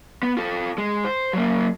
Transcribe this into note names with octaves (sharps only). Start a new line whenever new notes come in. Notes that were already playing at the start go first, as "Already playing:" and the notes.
B3
F4 A4
G#3
C5
F#3 A#3